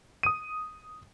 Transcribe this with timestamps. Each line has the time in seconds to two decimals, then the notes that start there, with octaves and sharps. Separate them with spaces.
0.23 D#6 D#7